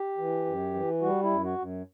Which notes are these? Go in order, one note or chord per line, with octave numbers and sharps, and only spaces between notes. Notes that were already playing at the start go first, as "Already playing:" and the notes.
Already playing: G4
E3
F#2
E3
G3 F#4
E4
F#2
F#4
F#2